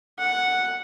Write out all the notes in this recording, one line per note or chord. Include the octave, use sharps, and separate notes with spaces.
F#5